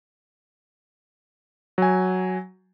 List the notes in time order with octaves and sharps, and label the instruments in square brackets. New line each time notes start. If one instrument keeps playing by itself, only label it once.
[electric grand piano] F#3 G#5